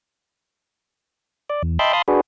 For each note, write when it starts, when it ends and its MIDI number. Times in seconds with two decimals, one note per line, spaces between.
1.50 1.62 74
1.63 1.78 40
1.79 1.93 75
1.79 1.93 76
1.79 1.93 79
1.79 1.93 81
1.79 1.93 83
1.79 1.93 84
1.93 2.02 77
1.93 2.02 81
1.93 2.02 83
1.93 2.02 84
1.93 2.02 87
2.08 2.21 62
2.08 2.21 66
2.08 2.21 68
2.08 2.21 71